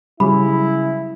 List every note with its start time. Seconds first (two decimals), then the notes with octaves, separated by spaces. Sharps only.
0.20 C#3 F#3 G3 E4 B5